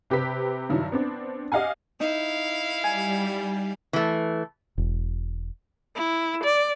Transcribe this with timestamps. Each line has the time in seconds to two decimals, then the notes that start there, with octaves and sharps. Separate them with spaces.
0.10 C3 G4 B4 B6
0.69 G2 D#3 F#3 E4
0.92 B3 C4 D4
1.52 G4 D#5 F5 F#5 G#5
2.00 D#4 E4 F5
2.84 G3 G#5
3.93 E3 A3
4.78 E1
5.96 E4
6.44 D5